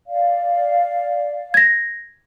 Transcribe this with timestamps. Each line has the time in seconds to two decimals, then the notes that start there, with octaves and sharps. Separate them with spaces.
0.07 D5 F5
1.54 G#6 A#6